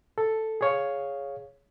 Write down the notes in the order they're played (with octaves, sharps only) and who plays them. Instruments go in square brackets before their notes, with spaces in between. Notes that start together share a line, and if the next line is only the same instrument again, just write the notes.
[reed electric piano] A4
G#4 C#5 F5